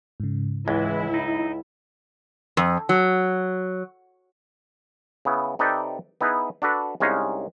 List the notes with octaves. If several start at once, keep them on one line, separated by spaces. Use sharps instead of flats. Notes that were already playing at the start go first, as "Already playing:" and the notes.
G#2 C#3
C#2 E3 G#3 E4
D#4
F2
F#3
C#3 B3 E4
C3 D#4 A4 B4 D5 G5
B3 D#4 E4 G#4 B4
D4 F#4 A4 B4
C2 G#3 C#4 D#4 F5